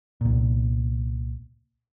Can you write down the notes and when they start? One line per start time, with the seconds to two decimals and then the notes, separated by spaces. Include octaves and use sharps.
0.21 C2 A#2